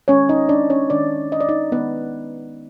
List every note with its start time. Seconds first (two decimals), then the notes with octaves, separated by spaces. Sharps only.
0.08 G#3 C#4 C#5
0.12 D#3
0.29 D#4 D#5
0.49 D4 D5
0.70 C#4 C#5
0.90 D#3 G#3 D4 D5
1.32 D#5
1.40 D5
1.49 D#4 D#5
1.72 D#3 G#3 B3 B4